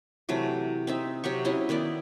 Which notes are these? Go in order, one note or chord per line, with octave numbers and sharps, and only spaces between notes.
C3 E3 F#3 A3
C4 D#4 E5
C3 F#3 G4 C#6
F#3 C#4 E4 D#5
D#3 B3 E4 D5